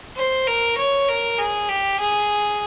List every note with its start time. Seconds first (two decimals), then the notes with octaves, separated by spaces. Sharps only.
0.16 C5
0.47 A#4
0.77 C#5
1.08 A#4
1.38 G#4
1.69 G4
1.99 G#4